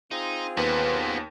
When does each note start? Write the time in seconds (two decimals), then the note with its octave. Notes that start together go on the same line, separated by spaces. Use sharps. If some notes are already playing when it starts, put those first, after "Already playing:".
0.11 C4 D#4 F4 G#4
0.57 D#2 B3 C#4 B4